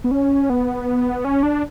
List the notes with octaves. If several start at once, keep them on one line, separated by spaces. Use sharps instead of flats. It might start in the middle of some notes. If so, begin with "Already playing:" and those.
B3
C#4
B3
C#4
D4